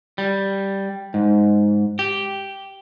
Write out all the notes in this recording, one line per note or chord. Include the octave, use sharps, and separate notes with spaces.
G3
G#2
G4